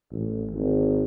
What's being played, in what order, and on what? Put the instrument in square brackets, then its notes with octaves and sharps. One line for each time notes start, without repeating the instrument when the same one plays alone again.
[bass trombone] A1
G#1